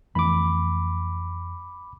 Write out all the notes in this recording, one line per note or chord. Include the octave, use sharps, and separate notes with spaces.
F2 E3 A3 B5 D6